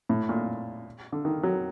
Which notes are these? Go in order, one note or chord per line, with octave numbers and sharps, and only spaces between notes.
A2
A#2
D3
D#3
F#3